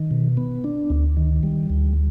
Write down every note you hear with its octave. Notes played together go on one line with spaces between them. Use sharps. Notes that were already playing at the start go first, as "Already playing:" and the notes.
Already playing: D#3
B2
B3
D4
D2
D#3
G3
D2